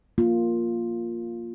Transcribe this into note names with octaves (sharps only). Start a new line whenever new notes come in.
A#3 F4